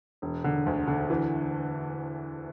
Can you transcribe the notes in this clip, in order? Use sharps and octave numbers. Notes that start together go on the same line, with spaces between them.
E1
D3
D2
D3
E3